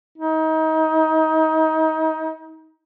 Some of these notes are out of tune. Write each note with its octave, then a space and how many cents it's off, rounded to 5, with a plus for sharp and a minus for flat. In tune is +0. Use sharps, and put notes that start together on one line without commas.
D#4 +30